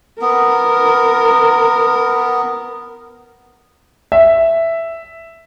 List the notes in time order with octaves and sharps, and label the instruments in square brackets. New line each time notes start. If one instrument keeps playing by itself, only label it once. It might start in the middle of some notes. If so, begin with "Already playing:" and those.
[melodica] B3 [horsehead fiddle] A#4
[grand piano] E5